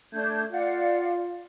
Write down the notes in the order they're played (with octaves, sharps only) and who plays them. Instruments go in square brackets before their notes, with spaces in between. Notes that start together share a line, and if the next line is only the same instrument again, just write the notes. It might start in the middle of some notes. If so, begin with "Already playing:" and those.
[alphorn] A3 [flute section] D4 G6 G#6
[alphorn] F4 [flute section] D5 F5 F#5